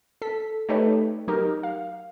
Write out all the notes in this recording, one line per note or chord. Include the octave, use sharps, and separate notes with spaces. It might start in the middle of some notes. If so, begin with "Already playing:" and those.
A4 B6
A3 D#4 G4 A4 B4 C#5
F#3 D#4 G4 A#4
F5